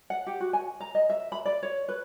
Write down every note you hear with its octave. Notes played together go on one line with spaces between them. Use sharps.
F#5
G4
F#4
G#5
A#5
D#5
E5
B5
D5
C#5
B4